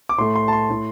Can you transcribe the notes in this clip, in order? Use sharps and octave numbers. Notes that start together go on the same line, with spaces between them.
D6
A2 A3 C6
C6
A5
C6
A2 A3